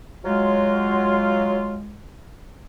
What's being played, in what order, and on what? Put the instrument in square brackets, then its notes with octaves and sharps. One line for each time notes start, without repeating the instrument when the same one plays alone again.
[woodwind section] F#3 F4 [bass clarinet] G#3